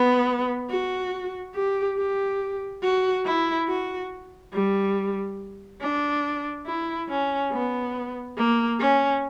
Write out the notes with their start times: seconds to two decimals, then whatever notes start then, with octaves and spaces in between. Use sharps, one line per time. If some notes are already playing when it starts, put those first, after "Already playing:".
Already playing: B3
0.69 F#4
1.55 G4
1.97 G4
2.83 F#4
3.25 E4
3.68 F#4
4.53 G3
5.81 D4
6.66 E4
7.09 C#4
7.52 B3
8.37 A#3
8.80 C#4